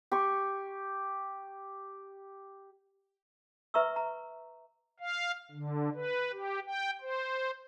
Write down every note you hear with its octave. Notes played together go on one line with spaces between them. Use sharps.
G4 C6 C#6
B4 E5 A#5 C#6 E6
A#5
F5
D3
B4
G4
G5
C5